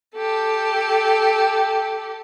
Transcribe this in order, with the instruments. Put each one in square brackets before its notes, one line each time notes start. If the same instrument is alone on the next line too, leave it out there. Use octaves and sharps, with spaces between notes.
[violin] G4 A4